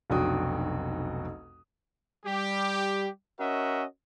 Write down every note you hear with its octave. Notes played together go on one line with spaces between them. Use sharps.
F1 B1 D4 F#4 G5 D#6
G3 G4
C#4 F#4 A#4 D#5 E5 F#5